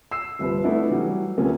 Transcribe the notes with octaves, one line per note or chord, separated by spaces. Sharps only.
E6 C7 E7
G1 C2 F3 B4
A3 B3 D4 E4
E3 F#3 G3
D2 C3 F3 A#3 B3 C#4